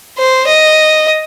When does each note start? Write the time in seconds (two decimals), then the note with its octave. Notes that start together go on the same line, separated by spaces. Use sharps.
0.18 C5
0.47 D#5